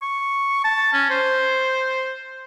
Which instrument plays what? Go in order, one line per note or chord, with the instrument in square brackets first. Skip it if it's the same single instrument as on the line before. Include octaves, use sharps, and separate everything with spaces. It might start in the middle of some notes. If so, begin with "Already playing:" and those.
[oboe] C#6
A5
C#4
C5